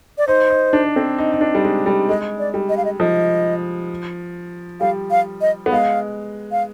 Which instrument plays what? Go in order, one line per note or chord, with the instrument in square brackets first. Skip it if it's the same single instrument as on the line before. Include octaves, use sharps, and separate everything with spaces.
[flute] D5
[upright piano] D#4 [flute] C5
[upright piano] D#4
D4
C4
D#4
D#4
D4
G3
G#3
G3
[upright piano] G#3 [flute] D#5
[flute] D5
[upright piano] G3
[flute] D#5
F5
D#5
[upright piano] F3 [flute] D#5
[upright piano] G3 [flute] F5
[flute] F5
D#5
[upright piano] B3
[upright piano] G#3 [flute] F5
[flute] F5